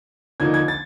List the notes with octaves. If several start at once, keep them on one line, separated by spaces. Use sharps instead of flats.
D3 F3 A#3 D#4 G#6
G#6
A6